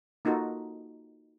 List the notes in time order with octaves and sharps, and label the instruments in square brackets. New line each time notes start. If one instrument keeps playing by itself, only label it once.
[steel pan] A#3 D#4 F4 F#4 A4